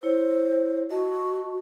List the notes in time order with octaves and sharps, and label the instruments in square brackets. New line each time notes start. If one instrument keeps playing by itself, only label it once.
[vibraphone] E4 C#5 [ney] C5
[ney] F#4 [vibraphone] D#5 A5